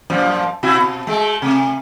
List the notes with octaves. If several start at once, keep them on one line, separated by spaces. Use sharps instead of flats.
F#2 A#2 F3
B2 E4 F#4
B2
G#3 A3
C3 A3